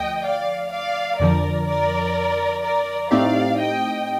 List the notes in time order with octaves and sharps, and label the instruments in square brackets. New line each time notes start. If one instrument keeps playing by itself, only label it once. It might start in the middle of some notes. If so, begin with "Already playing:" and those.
Already playing: [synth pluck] D2 F3 A3 [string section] D#5 G5
[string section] D5 F5
D5 F5
[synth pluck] F2 D3 F3 [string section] A#4 D5
[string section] A#4 D5
A#4 D5
[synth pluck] A2 A3 C4 D#4 G4 [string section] D5 F5
[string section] D#5 G5